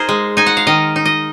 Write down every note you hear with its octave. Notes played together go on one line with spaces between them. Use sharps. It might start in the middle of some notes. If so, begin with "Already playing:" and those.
Already playing: D#4 G#4 A#4 C5
G#3
D#4 G#5
F#5
F5
D#3 D#5
D#4
D#5